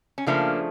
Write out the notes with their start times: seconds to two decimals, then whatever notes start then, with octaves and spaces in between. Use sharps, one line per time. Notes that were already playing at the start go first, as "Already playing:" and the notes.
0.18 C#4
0.26 C#3 F3 A3 A#3 D4